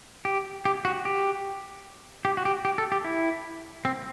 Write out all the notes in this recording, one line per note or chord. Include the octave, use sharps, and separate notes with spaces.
G4
G4
F#4
G4
G4
F#4
G4
G4
A4
G4
E4
C4